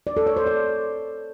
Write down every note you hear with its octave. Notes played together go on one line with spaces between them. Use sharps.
D5
A4
C#5
C5
D5